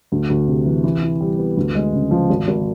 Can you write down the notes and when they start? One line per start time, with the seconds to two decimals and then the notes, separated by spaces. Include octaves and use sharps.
0.12 D2
0.30 D2
0.47 C3
0.66 E3
0.84 E3
1.03 E4
1.21 G3
1.38 B3
1.57 D2
1.75 G#3
1.93 C#3
2.11 F3
2.29 G#1
2.47 G#1